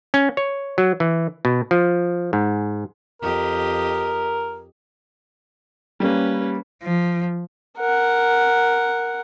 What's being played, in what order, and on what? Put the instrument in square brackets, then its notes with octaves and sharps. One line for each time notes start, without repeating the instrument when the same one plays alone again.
[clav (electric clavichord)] C#4
C#5
F#3
E3
B2
F3
G#2
[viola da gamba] F2 G4 D#5 [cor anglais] A#4
[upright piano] G3 A#3 [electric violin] C#4 B4
[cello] F3
[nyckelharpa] A#4 F#5